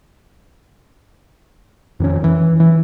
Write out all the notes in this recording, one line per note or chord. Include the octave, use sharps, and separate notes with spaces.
F2 D#3 C#4
E3
E3